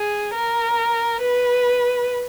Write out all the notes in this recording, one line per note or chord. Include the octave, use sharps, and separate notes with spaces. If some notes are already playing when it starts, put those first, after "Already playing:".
Already playing: G#4
A#4
B4